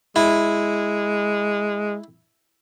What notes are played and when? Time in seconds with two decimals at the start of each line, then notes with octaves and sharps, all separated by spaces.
0.16 G#3 E4